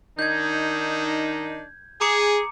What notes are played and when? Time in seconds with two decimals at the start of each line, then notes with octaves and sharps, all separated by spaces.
0.19 D#3 D4 D#4 G6 G#6
2.01 G#4 A#5 D6 C#7